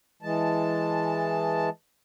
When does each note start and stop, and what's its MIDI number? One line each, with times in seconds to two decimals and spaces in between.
0.22 1.69 52
0.22 1.69 56
0.22 1.69 81